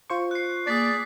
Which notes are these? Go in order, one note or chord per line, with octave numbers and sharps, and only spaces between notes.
F4 C5 C#6
F#6 C7
A#3 G#4 D5 A6 B6